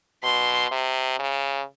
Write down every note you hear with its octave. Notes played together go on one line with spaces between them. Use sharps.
B2 C6
C3
C#3